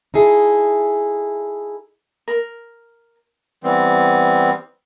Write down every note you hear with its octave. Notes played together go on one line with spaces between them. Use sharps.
D#4 E4 G#4 A4
A#4
E3 G3 B3 C4